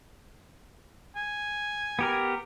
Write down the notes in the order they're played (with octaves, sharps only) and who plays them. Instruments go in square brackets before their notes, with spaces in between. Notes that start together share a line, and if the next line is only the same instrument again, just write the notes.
[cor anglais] G#5
[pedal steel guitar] B3 G4 A#4